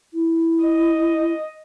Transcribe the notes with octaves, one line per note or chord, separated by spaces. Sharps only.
E4
D#5